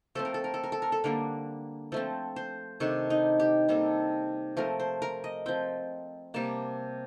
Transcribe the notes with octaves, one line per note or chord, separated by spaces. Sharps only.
F3 A3 C4 A4
A#4
A4
A#4
A4
A#4
A4
A#4
A4
D3 G3 A#3 D4 A#4
F3 A3 C4 A4
C5
C3 D#3 A3 D4 A4
D#4
G4
C3 G3 A#3 A4
F3 A3 C4 A#4
C5
A#4
D#5
F3 C4 G5
C3 G3 A#3 A5